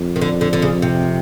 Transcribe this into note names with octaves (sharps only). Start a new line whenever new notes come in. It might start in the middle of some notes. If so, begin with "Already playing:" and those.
Already playing: F2
D#3
D3
D3
D3
C#3
C3